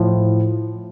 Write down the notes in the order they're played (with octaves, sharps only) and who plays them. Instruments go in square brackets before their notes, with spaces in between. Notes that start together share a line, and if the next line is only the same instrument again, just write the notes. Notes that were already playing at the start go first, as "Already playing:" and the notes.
Already playing: [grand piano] A2 F3